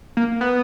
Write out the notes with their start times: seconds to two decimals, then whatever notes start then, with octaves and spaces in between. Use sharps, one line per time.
0.17 A#3
0.41 B3